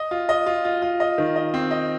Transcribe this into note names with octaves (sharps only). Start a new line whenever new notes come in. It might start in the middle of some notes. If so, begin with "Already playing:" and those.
Already playing: D#5
F4
D#5
F4
F4
F4
D#5
D#3
D#5
C4
D#5